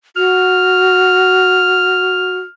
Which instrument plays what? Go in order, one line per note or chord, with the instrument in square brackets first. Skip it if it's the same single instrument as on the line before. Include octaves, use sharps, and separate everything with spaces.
[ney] F#4 [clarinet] F6